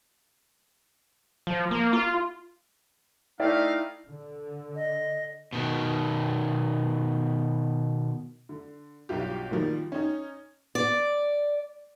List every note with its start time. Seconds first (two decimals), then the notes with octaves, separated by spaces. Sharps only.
1.47 F3
1.71 A#3
1.93 F4
3.40 A3 D#4 E4 D5 F5 G5
4.07 D3
4.75 D#5
5.53 B2 D#3
8.49 D3
9.09 B1 G2 F4 G4
9.51 A#2 D#3 F3 G3
9.92 C#4 D#4
10.75 D5